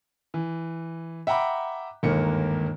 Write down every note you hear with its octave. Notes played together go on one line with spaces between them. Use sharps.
E3
E5 F#5 G5 A#5 B5 D6
G1 D#2 G#2 A#3 C#7